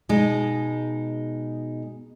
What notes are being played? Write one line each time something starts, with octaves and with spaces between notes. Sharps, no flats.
B2 G#3 D#4